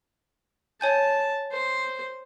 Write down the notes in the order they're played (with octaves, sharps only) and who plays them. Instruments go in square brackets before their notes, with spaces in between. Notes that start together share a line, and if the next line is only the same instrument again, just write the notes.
[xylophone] C#5 G#5 G6 [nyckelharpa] A5
[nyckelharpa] C5